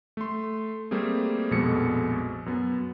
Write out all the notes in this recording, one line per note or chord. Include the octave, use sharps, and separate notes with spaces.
A3 C6
G3 A3 A#3 C4 G#4
A#1 F2 B2 G#3 A4 C#7
F#2 B3